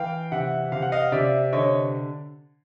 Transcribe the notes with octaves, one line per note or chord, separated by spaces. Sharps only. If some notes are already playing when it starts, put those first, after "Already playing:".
Already playing: E3 F5 G5
C3 E5 F#5
C3 F5
F#5
D#5 F5
C3 D5 E5
D3 C#5 D#5